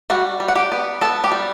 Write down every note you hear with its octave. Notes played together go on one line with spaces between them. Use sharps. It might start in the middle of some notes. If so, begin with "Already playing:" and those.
G3 F#4 F#5
G3
F#5
G4 G5
B3
B3 A4 A5
G4 G5
G3